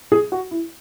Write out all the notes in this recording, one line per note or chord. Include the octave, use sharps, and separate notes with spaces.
G#4
F#4
E4